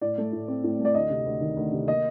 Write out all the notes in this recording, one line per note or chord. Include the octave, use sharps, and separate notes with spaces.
A2 D5
A3
A2
C4
A2
A3
D5
D2 D#5
C3
D2
D#3
D2
C3
A#3 D#5